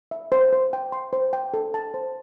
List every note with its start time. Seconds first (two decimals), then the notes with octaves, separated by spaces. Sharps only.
0.11 E5
0.32 C5
0.53 C5
0.73 G5
0.92 C6
1.13 C5
1.33 G5
1.54 A4
1.74 A5
1.94 C5